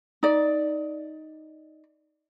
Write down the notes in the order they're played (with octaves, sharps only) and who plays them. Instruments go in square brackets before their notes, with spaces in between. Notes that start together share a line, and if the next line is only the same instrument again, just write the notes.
[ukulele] D#4 D5